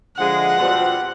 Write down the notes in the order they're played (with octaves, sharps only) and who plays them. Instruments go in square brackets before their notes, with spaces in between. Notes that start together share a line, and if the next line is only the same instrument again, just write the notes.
[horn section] D3 F3 G#3 [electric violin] F#5
[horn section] B2 G3 C4 F4